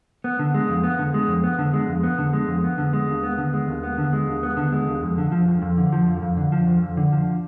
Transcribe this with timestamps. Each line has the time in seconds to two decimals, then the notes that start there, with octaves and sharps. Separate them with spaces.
0.24 B3
0.39 D3
0.55 G#3
0.69 F2
0.84 B3
0.99 D3
1.14 G#3
1.28 F2
1.44 B3
1.59 D3
1.74 G#3
1.88 F2
2.03 B3
2.18 D3
2.33 G#3
2.48 F2
2.64 B3
2.78 D3
2.93 G#3
3.08 D#2
3.23 B3
3.38 D3
3.53 G#3
3.68 D#2
3.83 B3
3.98 D3
4.13 G#3
4.28 D#2
4.43 B3
4.57 D3
4.72 G#3
4.88 D#2
5.02 F2
5.18 D3
5.32 F3
5.48 F2
5.62 F2
5.77 D3
5.93 F3
6.08 F2
6.22 F2
6.37 D3
6.52 F3
6.67 F2
6.82 F2
6.97 D3
7.12 F3